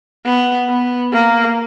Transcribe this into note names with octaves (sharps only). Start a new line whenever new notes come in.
B3
B3
A#3